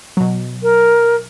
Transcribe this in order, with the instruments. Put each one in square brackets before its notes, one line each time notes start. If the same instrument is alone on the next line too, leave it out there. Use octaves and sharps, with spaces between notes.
[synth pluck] B2 F#3
[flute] A#4